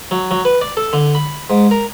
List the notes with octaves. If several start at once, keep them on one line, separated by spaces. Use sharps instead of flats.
F#3
F#3
B4
D5
A4
D3
B5
G#2
A#4